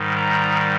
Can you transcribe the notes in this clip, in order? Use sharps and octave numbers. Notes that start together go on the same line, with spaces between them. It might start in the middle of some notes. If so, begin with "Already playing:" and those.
Already playing: G#2 D#3 G3
A#5